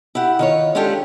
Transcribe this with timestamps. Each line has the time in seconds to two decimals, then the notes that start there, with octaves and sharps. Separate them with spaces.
0.15 E4 G4 F#5
0.39 D#3 F4 C#5
0.75 G#3 C#4 D4 F4 G4 A4